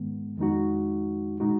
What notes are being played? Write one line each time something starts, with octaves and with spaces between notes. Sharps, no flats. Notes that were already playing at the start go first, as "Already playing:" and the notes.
Already playing: G#2 D#3 G#3 B3
F2 D#3 G#3 D#4 F#4
A#2 G#3 D#4 F#4